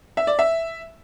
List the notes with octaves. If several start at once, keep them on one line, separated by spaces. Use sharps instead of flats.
E5
D5
E5